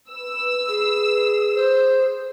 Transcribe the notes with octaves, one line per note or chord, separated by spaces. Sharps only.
B4 E6
G#4
C5